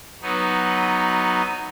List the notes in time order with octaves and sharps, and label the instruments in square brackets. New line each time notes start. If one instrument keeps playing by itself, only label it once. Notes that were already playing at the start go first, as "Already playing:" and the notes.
[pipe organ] F#3 B3 D#4